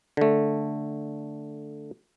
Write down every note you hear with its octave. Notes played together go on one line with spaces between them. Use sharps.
D3 A3